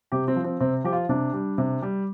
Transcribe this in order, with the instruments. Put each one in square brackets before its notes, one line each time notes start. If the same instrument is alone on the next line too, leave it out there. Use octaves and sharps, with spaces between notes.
[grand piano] C3 G4
C4
F3
C4
C3 C4
F3 G4
F4
C3 D4
G3
C3
G3